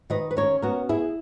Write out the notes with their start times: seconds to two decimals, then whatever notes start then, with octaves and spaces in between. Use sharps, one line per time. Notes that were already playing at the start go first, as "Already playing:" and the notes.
0.10 D#3 B4 D#5
0.31 B4
0.37 C#4 A#4 C#5
0.62 B3 F#4 A#4
0.89 E4 G#4